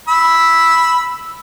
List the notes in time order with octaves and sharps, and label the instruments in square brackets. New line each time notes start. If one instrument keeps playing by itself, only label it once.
[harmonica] B5 E6